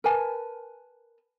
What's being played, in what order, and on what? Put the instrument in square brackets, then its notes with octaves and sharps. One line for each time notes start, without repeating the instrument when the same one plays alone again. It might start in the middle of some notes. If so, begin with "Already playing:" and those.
[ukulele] A#4 B4 G#5 A5